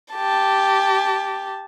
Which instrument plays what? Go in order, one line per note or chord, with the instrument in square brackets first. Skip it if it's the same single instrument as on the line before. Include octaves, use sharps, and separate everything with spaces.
[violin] G4 A5